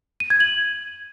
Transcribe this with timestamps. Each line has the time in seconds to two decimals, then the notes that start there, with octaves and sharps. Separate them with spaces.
0.20 D#7
0.30 G#6
0.40 F#7